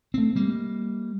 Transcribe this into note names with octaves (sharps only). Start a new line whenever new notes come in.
A3 C4
G3 A#3